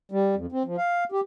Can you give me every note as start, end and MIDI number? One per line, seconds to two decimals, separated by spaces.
0.12 0.35 55
0.35 0.46 41
0.52 0.63 60
0.65 0.76 53
0.78 1.04 77
1.12 1.21 67